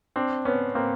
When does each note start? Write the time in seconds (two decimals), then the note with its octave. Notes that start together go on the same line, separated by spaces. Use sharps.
0.16 C4 D4
0.45 B3 C#4
0.75 A#3 C4